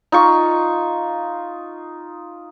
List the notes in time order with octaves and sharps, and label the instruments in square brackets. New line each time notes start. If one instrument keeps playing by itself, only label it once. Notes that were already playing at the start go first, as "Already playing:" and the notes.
[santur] D#4 F4 C#6